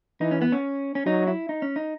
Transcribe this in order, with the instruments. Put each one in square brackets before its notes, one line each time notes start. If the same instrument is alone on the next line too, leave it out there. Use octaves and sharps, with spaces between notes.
[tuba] E3 [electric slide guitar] D#4
[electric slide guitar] C#4
B3
C#4
C#4
[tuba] F#3 [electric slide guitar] D#4
[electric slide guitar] E4
D#4
C#4
D#4